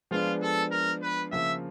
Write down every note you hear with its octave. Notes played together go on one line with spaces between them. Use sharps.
F3 G#3 B3 D4 F4
A4
A#4
B4
C#3 F3 A#3 E5